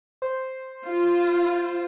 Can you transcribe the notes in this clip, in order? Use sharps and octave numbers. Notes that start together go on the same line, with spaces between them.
C5
F4